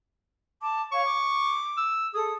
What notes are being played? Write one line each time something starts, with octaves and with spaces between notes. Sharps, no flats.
A5 D6
C#5 F5 C#6
D6
E6
G#4 A4 D#6